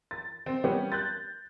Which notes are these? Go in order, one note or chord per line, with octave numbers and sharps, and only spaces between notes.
A6
C4
G3 B3 C#4 G4
F#6 G6 A6